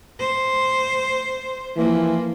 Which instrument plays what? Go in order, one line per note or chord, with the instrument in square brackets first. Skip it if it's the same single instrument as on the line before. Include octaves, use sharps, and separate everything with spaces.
[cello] C5
[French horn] E3 [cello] F3 A#3